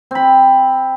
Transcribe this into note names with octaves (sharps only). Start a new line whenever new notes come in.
C4 B5